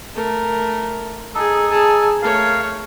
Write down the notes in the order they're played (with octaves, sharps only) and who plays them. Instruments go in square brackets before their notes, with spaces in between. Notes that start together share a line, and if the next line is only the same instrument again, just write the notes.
[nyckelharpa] A3 A#4
[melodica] D#4 A4 [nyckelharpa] G#4
[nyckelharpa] G#4 A5
[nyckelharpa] A3 C#5 [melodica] A#4 F5